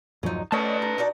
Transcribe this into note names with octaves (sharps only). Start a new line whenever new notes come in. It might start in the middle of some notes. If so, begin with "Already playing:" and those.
D1 F#2 F3 F#3 D#4
A3 C#4 D4 B4 D#5 A5
D#4
D#4 F#4 D5